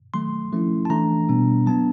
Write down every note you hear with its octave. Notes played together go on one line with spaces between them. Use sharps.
D#3 F#3 A3 C6
F3 A3 C#4 E4
A5
E3 A3 D4 A#5
B2 G3 B3 D4
F#3 B3 D4 A5